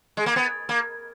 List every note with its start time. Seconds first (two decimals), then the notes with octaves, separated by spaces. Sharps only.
0.17 G#3
0.26 A#3
0.36 B3
0.69 A#3